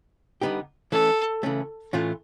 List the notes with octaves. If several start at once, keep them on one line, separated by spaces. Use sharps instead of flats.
D3 G3 B3 D#4 G4
E3 A3 C#4 A4
C#3 E3 A3 C#4
A2 E3 A3 C#4 F4